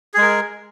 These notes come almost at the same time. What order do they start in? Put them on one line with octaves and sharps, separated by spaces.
G#4 G#3 A#4